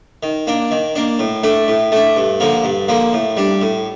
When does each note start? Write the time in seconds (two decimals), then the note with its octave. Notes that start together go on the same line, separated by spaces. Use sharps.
0.23 D#3
0.47 A#3 D4
0.71 D#3
0.96 A#3 D4
1.19 A2
1.43 A3 D4
1.68 A2
1.92 A3 D4
2.16 G2
2.40 D3 F3 A#3
2.64 G2
2.88 D3 F3 A#3
3.13 A2
3.37 G3 D4
3.62 A2